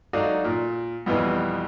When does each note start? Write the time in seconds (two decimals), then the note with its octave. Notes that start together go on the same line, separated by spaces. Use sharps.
0.13 F#3 D4 D#4 F#4 A4 F5
0.44 A#2
1.06 F2 B2 E3 G3 B3